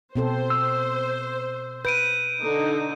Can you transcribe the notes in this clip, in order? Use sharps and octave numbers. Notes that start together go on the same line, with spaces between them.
B2 C4 A4 C5
E6
B4 G6 D7 D#7
D3 D#4